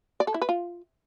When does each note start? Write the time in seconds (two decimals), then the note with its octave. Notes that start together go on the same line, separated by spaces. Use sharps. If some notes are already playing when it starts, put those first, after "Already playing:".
0.20 D5
0.27 A4
0.34 E4
0.42 B4
0.49 F4